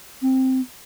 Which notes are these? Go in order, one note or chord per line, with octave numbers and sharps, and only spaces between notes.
C4